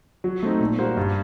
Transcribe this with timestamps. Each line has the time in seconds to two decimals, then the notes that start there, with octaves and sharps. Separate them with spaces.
0.24 F#3
0.43 A3 C4 D#4
0.60 A#2
0.79 G3 A#3 F#4 C5
0.97 G2